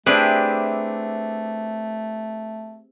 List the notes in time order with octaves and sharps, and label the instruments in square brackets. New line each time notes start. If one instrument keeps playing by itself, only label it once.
[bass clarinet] A3 [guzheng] C4 G4 G#4 [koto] D4 E4 B4